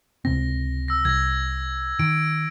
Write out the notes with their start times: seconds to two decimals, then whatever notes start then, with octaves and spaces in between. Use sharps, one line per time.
0.25 C#2 C3 C4 A#6
0.88 E6 A#6
1.05 C2 G#6 A#6
1.99 D#3 D7